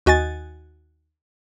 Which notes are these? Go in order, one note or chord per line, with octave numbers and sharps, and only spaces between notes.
D#2 F#4 D#5 G#5 A6